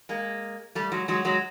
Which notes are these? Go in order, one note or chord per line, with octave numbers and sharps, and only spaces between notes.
G#3 A#3
G3 A3
F#3 G#3
F#3 G#3
F#3 G#3